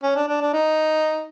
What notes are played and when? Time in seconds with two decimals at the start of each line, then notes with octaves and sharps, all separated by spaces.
0.03 C#4
0.16 D4
0.28 D4
0.41 D4
0.53 D#4